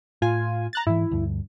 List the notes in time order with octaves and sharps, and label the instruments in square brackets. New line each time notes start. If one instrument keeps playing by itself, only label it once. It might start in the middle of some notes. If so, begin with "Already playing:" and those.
[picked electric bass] A2 [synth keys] F4 G#5
[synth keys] A#5 F#6 A6
[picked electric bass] G#2 E3 [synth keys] E4
[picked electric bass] D2 G2